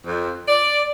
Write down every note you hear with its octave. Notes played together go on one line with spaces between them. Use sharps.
F2
D5